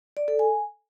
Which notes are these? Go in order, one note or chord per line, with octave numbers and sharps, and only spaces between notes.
D5
A4
G#5